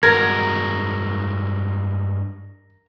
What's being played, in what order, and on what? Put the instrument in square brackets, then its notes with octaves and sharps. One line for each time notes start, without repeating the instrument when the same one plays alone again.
[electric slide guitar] G2 G#3 F#4 [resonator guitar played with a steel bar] A#4 [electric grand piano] G#6 [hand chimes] A#6